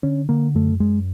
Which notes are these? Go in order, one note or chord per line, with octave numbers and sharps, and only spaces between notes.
D3 C#4
D3 A#3
F#2 A3
F#2 G#3